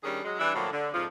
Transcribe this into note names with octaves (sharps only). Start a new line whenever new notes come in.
D#3 G3 C#4 D4 G#4
F#3 G#3
E3 G3 D4 E4
A2 D3 F3 F#3 A#3
D3
F2 G#2 F3